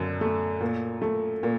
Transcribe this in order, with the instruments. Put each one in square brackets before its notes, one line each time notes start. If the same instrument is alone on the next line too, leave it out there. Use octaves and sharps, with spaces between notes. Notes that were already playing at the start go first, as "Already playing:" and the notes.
Already playing: [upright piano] F#2 D3
A3
A#2
A3
A#2